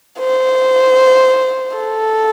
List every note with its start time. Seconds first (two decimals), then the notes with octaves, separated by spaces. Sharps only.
0.19 C5
1.77 A4